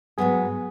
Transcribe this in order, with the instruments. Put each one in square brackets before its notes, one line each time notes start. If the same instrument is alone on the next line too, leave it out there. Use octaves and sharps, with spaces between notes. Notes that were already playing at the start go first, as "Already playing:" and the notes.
[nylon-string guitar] G#2 F#3 B3 F#4 [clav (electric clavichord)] G#4